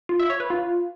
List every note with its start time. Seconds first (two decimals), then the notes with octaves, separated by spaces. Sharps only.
0.09 F4
0.20 E5
0.30 C#5
0.40 B4
0.50 F4